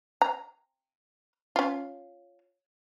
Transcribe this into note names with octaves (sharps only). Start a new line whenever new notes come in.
A#5
C#4 F4